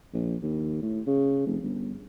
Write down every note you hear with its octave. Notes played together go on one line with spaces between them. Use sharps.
A#1
D#2
A2
C#3
F1
G1